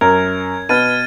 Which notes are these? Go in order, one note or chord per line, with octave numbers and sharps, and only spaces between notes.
F#2 A#4 G#6
B2 B4 F6 A6 D#7